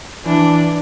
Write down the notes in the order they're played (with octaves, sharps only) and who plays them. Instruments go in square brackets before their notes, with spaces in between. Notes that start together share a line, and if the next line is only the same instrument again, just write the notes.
[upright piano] E3 [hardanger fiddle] D4